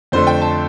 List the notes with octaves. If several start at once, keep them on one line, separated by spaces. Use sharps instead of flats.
F2 D3 A3 C5
G5
A5